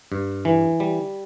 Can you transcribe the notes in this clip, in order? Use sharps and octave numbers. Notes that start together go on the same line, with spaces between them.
G2
E3
G3